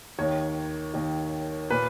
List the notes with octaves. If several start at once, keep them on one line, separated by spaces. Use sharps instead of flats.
D#2 D#3 C#5
D#2 D#3
A#2 B4